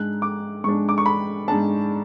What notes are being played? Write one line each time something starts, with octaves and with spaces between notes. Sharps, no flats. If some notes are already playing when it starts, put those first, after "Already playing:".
Already playing: G#2 G#3 D4 F#6
D6
G#2 G#3 D4 C#6
D6
C#6
B5
G#2 G#3 D4 A5